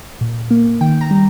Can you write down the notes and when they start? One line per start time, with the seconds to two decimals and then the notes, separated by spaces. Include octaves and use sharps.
0.21 A#2
0.51 A#3
0.81 D#3 G5
1.01 A#5
1.11 G3